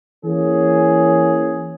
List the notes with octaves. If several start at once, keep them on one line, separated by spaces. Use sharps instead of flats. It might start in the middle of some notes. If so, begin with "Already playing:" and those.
E3 A#3 C#4 G#4